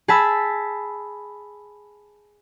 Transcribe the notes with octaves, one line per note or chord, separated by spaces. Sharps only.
G#4 A5 B5 E6